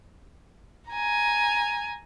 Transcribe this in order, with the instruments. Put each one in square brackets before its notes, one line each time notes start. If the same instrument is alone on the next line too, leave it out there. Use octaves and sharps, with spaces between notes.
[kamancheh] G#5 A#5